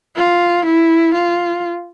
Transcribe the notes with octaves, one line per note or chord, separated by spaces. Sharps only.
F4
E4
F4